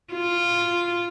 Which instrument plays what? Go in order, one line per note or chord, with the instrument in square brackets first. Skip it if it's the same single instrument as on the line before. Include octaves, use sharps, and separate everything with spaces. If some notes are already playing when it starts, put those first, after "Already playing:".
[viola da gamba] F4